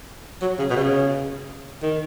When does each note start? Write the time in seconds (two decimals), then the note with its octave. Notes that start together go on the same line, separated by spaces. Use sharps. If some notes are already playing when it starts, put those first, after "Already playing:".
0.41 F#3
0.59 C#3
0.70 B2
0.76 C#3
1.83 D#3